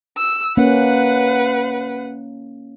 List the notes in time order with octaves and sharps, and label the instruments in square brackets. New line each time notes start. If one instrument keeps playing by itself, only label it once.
[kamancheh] E6
[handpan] A#3 C#4 [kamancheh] B4 F#5